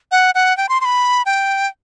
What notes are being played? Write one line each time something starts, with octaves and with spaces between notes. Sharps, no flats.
F#5
F#5
G5
C6
C6
B5
G5